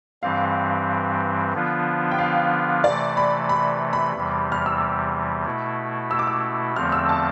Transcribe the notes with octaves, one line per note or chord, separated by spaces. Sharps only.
G2 E3 G3 C4 F5
D3 F3 B3 D4 F4
G5
F5
C3 E3 A3 D5
B5
B5
B5
E2 C3 E3 G3
F6
E6
D6
B2 A3 E4
E6
D6
E6
E2 D3 F3 A3 C4 F6
E6
A5